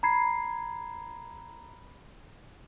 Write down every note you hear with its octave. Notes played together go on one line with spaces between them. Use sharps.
A#5 B5 G#6 C7